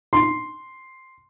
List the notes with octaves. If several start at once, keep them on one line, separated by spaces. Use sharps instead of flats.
C6